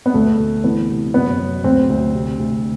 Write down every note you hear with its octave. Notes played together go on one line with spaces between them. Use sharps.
B3
D2 A3
D2
E3 B3
C3
F#2 B3
F#3
D2 C4
D2
C3
D2